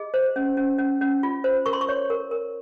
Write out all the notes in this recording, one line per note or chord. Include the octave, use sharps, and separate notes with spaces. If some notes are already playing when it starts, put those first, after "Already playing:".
Already playing: G#4 D#5
C5
C#4
C#4
C#4
C#4
F4
C5
A#4 C#6
C6
C#6
C#5
A#4
A#4